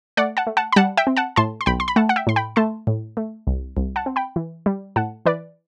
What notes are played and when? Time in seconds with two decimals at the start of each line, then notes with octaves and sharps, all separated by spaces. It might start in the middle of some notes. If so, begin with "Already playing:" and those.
0.17 A3 D5 F#5
0.37 F#5 A5
0.47 A3
0.57 F#5 A5
0.72 B5
0.76 G3 F#5 A5
0.97 E5 G5
1.07 C4
1.17 F#5 A5
1.36 A2 A5 C6
1.61 C6
1.66 B1 G5 B5
1.80 C6
1.88 B5
1.96 A3 F#5 A5
2.09 F#5
2.16 E5 G5
2.27 A2 C6
2.36 G5 B5
2.56 A3 A5 C6
2.87 A2
3.17 A3
3.47 C2
3.77 C2
3.96 F#5 A5
4.06 C4
4.16 G5 B5
4.36 E3
4.66 G3
4.96 A2 F#5 A5
5.26 E3 B4 D5